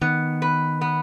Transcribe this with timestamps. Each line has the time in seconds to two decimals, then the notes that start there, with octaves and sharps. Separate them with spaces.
0.01 D#3 B3
0.42 B4
0.81 B3